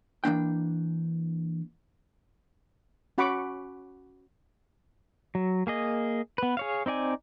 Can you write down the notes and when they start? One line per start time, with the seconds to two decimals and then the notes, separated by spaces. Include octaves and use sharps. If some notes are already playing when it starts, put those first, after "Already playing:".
0.24 E3 A#3 D4 G5
3.18 C#4 F#4 F#5 B5 C#6 D6
5.35 F#3
5.67 A#3 G#4 D#5
6.38 B3 B4
6.57 G#4 C#5 F5
6.86 C4 D#4 D5 G#5